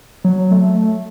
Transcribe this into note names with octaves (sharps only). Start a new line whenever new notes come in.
F#3
A3